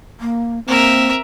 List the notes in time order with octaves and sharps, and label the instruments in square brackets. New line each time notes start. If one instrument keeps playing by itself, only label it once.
[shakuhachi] A#3
[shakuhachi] A#3 [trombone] C4 [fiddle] A#4 E5